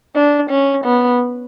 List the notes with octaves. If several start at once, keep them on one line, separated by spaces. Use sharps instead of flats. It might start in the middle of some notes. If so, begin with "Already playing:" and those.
D4
C#4
B3